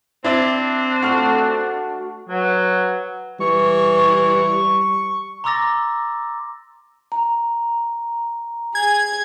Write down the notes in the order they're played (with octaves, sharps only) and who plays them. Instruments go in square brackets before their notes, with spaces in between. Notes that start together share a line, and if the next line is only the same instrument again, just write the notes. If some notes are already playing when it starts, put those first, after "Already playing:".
[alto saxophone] C4 [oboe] D4 [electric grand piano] E4 D5 E5
[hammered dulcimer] A3 F#4 F#5 [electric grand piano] C#6 F6
[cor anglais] F#3 [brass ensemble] B4 C#5 F#5
[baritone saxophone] E3 [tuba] G3 [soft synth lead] C#6
[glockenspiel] A#5 C6 D6 E6 A6 A#6
[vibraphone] A#5
[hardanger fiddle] G#4 [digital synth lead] G#6